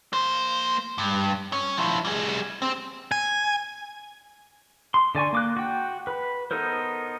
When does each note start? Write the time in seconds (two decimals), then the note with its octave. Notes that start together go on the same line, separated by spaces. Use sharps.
0.13 A#3 C5
0.98 G2
1.53 C#4 C#5
1.78 F3 E4
2.05 G3 G#4
2.62 C4
3.12 G#5
4.94 C6
5.15 D3 D5 G#5 C#6
5.33 A#3 D6 F#6
5.57 F#4 G5
6.07 B4 B5
6.51 B3 D#4 A4 A#4 C5